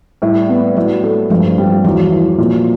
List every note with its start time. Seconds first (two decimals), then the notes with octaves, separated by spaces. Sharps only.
0.22 A2 G3
0.49 B3
0.76 A2 F#3
1.03 A3
1.30 G2 F3
1.58 G3
1.84 E2 F#3
2.11 E3
2.38 A#2